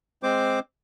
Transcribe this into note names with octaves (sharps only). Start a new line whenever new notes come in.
G#3 C4 C5 D6